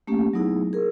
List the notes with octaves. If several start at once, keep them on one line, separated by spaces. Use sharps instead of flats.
A3 A#3 C#4 G4
F#3 A3 B3 D#4 E4 G#4
G#4 A#4